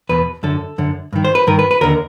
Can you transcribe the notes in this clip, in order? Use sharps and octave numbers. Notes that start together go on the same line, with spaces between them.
E2 B2 B4
F#2 D3 A4
F#2 D3
G2 D#3
C5
B4
G2 D#3 A#4
B4
B4
D#2 D3 A#4